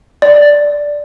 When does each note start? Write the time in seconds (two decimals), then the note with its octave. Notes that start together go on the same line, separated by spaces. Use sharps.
0.22 D5